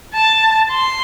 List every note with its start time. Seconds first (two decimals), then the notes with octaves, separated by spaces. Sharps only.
0.14 A5
0.71 C6